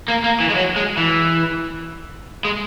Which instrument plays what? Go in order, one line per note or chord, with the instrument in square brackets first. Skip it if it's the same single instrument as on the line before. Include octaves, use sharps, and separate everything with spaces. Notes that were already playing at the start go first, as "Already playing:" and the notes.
[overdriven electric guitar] A#3
A#3
E3
G#3
F#3
G#3
E3
G#3